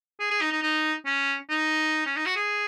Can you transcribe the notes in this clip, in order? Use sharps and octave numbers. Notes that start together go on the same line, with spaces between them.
G#4
G#4
D#4
D#4
D#4
C#4
D#4
C#4
D#4
F#4
G#4